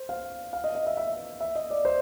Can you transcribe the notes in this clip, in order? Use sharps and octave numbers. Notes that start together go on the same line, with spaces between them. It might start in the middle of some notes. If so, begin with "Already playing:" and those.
Already playing: C5
F5
F5
D#5
D#5
E5
E5
E5
D#5
D5
C5